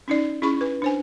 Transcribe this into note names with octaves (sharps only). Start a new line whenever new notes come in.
C#4 D#4 D5
C#4 E4 G#4 B5 C#6
B4
D4 C5 G#5